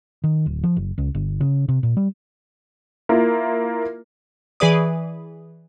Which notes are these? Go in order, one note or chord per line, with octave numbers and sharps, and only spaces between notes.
D#3
D1
F3
F#1
C#2
G1
C#3
C3
A#2
G3
A#3 E4 F4 A#4
E3 G#4 B4 D5 D#6